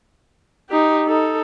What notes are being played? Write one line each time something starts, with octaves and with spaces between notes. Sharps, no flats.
D#4 G4
D#4 A4